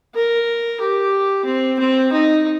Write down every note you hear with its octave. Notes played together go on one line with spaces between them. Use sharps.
A#4
G4
C4
C4
D#4